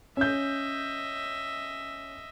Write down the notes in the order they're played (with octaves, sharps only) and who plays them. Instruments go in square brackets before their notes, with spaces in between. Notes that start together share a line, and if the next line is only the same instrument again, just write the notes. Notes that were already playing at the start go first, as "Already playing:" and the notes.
[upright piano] C#4 G6 [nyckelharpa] D#5 E5